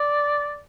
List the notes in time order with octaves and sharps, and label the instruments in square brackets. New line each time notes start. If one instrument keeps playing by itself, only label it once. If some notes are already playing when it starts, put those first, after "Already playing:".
Already playing: [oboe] D5